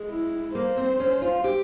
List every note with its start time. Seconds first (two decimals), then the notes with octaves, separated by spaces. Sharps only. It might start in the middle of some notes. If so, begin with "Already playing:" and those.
Already playing: G#3
0.11 E4
0.54 A#3 C5
0.77 C4
1.00 C#4
1.22 F4
1.44 G4